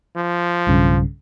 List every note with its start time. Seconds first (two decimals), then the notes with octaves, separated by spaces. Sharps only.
0.16 F3
0.67 B1 G2 C#3